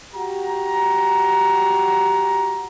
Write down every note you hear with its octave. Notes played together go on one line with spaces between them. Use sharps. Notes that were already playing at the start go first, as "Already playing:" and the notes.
F#4 G4 A#5